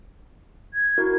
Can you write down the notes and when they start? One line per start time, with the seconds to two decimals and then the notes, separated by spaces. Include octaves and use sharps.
0.74 G#6
0.98 E4 F#4 A#4